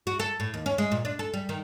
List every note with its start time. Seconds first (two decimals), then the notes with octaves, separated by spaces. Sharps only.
0.07 F#4
0.20 A4
0.40 A2
0.54 D#2
0.66 C#4
0.78 G#3
0.92 A#2
1.05 D4
1.19 A4
1.34 G3
1.49 D#3